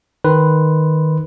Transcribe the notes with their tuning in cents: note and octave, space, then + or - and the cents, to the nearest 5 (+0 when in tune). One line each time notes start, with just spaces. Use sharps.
D#3 +0 B4 +0 C6 -10